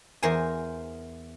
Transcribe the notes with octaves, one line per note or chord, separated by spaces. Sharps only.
E2 A#4 C5 G#5